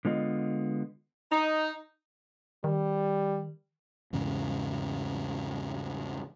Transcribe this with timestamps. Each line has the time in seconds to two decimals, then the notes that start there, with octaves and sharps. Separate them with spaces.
0.05 D3 G#3 B3 F4 D#5
1.31 D#4
2.64 D#3 G3
4.13 E2 G#2 C#3